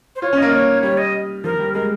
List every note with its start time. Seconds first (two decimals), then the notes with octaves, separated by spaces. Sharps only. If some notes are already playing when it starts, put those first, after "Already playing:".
0.16 C5
0.22 F4 C#5
0.33 C#4
0.38 A#3 D#5
0.52 C#5
0.83 G3 C#5
0.98 D#5
1.44 F3 A#4
1.59 G3
1.74 G#3 A#4